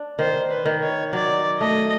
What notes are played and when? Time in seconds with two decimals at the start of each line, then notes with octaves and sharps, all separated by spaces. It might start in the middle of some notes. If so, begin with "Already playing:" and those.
Already playing: D4
0.19 D#3 C5
0.51 B4
0.66 D#3
0.82 C#5
1.13 F#3 D5
1.60 A3 D#5